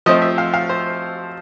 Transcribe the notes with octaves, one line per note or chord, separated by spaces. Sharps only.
F3 A3 C4 D#5
E5
F5
F5
C5